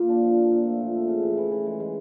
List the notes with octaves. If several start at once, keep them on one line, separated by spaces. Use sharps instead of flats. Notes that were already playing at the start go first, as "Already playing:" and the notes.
Already playing: A#3 F4
D4
F3
A#3
A#2
A3
A#2
A3
C#3
E3
E3
E3
G#3
G#3